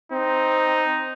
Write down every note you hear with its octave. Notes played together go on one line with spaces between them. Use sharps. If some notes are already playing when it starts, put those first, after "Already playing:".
C4 D#4